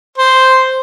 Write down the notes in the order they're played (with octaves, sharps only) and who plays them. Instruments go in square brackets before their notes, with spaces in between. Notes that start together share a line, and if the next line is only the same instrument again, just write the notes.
[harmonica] C5